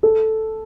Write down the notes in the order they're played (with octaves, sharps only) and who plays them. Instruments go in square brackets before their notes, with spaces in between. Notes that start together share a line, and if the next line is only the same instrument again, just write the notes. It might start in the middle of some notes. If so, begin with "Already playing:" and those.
[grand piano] A4